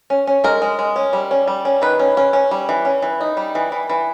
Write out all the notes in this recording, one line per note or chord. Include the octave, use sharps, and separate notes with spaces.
C#4
C#4
G#3 A#4
G#3
G#3
C#4
G3
C#4
G3
C#4
D#3 B4
C#4
C#4
C#4
G3
E3
C#4
E3
D#4
G3
E3
E3
E3